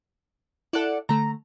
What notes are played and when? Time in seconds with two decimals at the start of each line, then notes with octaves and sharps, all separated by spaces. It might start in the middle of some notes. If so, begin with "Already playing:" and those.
0.73 E4 A4 D5 F#5
1.09 D3 A3 A#5